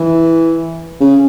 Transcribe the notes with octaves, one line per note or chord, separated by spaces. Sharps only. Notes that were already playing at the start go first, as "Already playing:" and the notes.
Already playing: E3
C#3